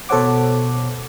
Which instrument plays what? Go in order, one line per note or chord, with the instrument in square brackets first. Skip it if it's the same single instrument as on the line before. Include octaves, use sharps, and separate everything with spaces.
[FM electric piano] B2 A4 C5 C#5 F#5 D6